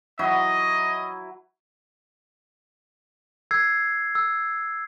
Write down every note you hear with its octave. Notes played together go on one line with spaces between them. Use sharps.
F#3 E4 D#5
E6 G#6 C7
E6